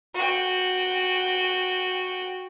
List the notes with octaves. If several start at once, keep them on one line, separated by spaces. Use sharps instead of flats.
F#4 G5